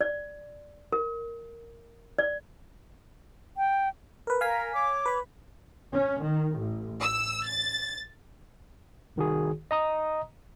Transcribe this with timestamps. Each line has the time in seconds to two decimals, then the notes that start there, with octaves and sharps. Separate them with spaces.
0.01 D5
0.92 A#4
2.18 D5
3.57 G5
4.27 A#4 B4
4.41 A#4 F5 G#5 B6
4.74 C#5 D6
5.06 B4 B5
5.93 C#4
6.22 D#3
6.56 A1
7.01 E6
7.46 A6
9.16 C2 D#3 F#4 G#4
9.71 D#5 A#5 D#6